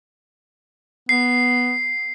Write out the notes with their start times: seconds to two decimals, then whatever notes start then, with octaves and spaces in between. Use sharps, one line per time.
1.09 B3 C7